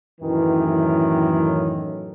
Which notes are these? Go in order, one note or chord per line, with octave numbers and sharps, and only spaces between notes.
F#2 A2 D#3 E3